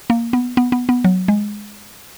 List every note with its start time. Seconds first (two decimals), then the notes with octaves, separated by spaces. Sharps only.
0.10 A#3
0.33 B3
0.57 B3
0.72 B3
0.89 B3
1.04 F#3
1.28 G#3